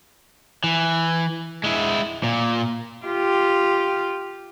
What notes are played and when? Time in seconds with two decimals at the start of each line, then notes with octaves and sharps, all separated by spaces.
0.64 E3
1.64 G#3 E4
2.23 A#2
3.05 F4 G4